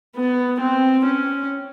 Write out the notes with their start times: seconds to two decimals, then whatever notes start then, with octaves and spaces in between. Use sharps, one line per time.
0.16 B3
0.60 C4
1.06 C#4